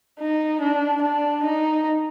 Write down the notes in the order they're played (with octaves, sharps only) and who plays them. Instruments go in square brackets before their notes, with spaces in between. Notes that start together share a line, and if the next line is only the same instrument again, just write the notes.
[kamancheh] D#4
D4
D4
D#4